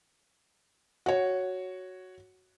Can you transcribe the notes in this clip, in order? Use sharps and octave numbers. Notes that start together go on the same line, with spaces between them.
F#4 C#5